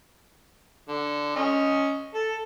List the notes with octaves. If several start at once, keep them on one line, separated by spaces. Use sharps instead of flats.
D3
C#4 D#5
A4